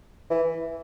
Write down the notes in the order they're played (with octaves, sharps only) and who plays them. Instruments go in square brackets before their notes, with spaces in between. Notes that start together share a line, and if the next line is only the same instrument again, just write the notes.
[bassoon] E3